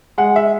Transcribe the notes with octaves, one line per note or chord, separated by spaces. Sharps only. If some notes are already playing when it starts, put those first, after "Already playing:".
G#3 F#5
E5